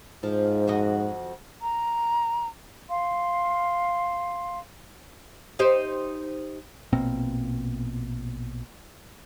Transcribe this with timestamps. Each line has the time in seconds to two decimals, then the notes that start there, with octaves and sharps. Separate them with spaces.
0.23 G#2 F3
0.67 F2 F#4 D#5
1.62 A#5
2.89 F5 C6
5.59 D#4 G4 C5
6.93 A#1 B2 A#3 C4